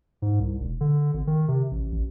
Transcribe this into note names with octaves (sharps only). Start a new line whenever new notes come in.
G#2
C2
E1
D3
G#1
D#3
C3
A1
A1